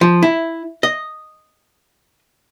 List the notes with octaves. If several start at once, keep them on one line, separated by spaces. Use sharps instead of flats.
F3
E4
D#5